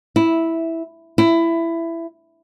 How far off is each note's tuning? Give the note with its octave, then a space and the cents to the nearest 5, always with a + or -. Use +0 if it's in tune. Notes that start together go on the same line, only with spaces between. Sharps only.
E4 -5
E4 +15